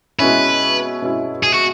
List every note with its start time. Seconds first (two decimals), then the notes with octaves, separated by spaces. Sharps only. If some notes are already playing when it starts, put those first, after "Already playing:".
0.19 B2 G#3 C#4 E4 B4
1.02 B2 G#3 C#4 E4
1.43 G#4
1.54 F#4